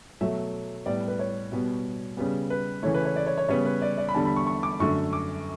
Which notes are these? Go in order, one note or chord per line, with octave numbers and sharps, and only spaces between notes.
B2 F#3 A3 E5
E5
A2 G3 B3 D5
B4
C#5
B2 G3 B3
C#3 G3 B3
B4
C#3 E3 A3 C#5
B4
C#5
D5
C#5
C#5
C#3 G3 B3 C#5
B4
D5
D5
B5
E2 D3 G3 A5
B5
C#6
C#6
D6
F#2 D3 A3 C#6
D6